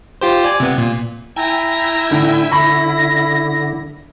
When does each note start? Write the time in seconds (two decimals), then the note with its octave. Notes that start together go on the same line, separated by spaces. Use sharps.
0.22 F4 G4 C5
0.44 D5 G#5
0.60 C3 B3
0.78 A#2
1.36 E4 G5 G#5 A#5 E6
2.10 A2 D3
2.51 D3 B5 C#6 A#6